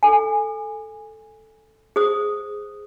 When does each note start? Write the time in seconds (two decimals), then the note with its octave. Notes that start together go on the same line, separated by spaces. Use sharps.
0.03 A4 G#5
1.96 G#4 C5 D#6